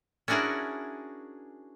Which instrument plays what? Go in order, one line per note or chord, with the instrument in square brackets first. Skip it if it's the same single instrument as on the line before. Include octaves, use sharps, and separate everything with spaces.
[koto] C#4 D4 E4 F#4 G#4 A#4